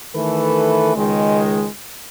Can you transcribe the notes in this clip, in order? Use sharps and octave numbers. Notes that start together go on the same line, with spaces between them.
D#3 E3 A3 A4 B4
C#2 D#3 G#3